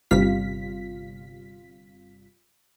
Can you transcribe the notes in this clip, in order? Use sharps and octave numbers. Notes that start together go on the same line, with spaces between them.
G1 C3 G3 F4 F5 B6